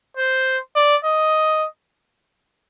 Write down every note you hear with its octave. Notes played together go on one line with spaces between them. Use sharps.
C5
D5
D#5